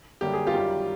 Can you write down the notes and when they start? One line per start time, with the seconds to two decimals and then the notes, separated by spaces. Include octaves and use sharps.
0.21 F#2 D3 G3 A#3 G4
0.33 G#4
0.47 F4 G4
0.54 F#2 D#3 G3